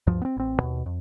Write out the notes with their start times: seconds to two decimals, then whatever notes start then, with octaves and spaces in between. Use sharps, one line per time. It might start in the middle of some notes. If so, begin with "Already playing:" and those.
0.07 D2 G2 F3
0.22 B3 C4
0.37 A1 C4
0.60 D#2 B2
0.86 F2